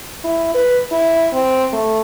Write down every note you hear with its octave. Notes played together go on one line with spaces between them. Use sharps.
E4
B4
E4
C4
A3